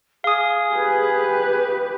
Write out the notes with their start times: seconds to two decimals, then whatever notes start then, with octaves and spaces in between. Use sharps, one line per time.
0.24 G#4 F5 D#6
0.74 G4 B4